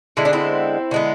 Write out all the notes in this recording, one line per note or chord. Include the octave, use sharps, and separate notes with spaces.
D3 G#3 B3 E4
D4
C4 E4
D3 G#3 B3